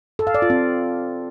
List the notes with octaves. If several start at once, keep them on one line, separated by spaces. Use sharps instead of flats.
A4
F5
D5
F4
C4